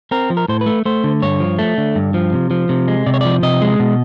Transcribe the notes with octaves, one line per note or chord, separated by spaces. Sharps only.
C4 A#4
F3
A#4
A2 C5
B4
A3
A3 C5
D3
G2 C#5
F3
A3
D3
G2
F3
C3
F3
C3
G#3
C3 D5
C#5
F3 D5
C3 D#5
G#3
B2